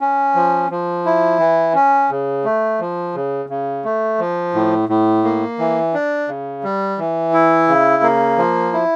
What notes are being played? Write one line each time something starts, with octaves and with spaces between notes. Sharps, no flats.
C#4
F3
F3
E4
E3
C#4
C#3
A3
F3
C#3
C#3
A3
F3
A2
A2
A#3
E3
D4
C#3
G3
E3
E4
C#3
A#3
F3
E4